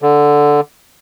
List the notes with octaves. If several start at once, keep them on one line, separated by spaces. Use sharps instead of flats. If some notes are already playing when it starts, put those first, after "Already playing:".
D3